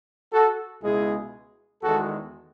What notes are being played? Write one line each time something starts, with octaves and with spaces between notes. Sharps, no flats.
F#4 A4
C#2 B2 G#3 E4 G#4
E2 D#3 G#3 F#4 A4